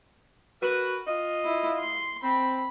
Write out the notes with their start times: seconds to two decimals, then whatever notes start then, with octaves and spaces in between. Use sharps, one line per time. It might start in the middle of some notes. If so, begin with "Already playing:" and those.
0.62 F#4 A#4 B4
1.07 F4 D#5
1.44 E4
1.80 C6
2.23 C4 B5